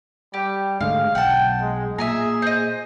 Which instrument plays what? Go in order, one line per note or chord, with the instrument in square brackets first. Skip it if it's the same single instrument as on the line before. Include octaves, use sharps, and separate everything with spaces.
[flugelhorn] G3 [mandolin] G4
[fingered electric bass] G#2 D3 A3 [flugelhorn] G#3 [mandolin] F5
[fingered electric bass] B1 [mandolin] F#5 A5 [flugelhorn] G5
[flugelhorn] G#3
[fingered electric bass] A#2 [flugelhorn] G#4 [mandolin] E5 G#5 A#5
[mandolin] C5 D#5